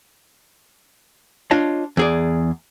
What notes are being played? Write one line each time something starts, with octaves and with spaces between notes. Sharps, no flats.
D4 F4 C#5 D#5 A5
E2 G#4 D5